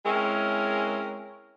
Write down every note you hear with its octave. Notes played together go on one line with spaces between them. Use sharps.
G#3 C4 C#4 E4 G#4 A#4